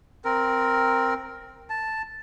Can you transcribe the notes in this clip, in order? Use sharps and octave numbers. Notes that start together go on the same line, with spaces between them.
C4 A#4
A5